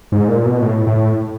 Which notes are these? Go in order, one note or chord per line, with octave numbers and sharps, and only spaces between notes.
G#2
A#2
B2
A2
A2